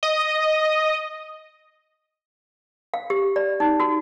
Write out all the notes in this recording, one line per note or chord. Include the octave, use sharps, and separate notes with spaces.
D#5
F5
G4
D5
D#4
F#4